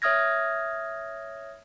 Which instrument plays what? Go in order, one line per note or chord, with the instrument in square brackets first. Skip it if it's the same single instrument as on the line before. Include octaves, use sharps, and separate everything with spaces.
[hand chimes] C#5 E5 D#6 F6 G#6 A#6